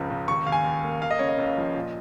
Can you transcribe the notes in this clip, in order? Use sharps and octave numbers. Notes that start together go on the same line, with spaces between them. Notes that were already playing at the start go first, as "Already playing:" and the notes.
Already playing: C#2 G#2 C#3 F3
C#2
D#2 C#6
D#2 F5
G#5
D#2
A#3
A#3 F5
D#5
C#3 C#5
D#5
C#2
F3
A#2